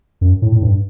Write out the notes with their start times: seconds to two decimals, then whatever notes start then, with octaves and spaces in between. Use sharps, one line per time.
0.21 F#2
0.42 A2
0.52 A2
0.62 G2